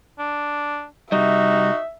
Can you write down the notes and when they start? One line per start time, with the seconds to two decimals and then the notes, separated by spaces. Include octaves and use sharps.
0.19 D4
1.12 C2 G3 D#4 F#4 E5